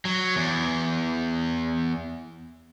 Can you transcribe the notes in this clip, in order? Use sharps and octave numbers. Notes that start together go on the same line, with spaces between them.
F#3
E2